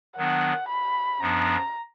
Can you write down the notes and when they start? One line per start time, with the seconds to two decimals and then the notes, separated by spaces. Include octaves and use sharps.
0.17 D#3 F#3 B3 D4 F#5
0.69 B5
1.21 F#2 F3 B3 D4 A#5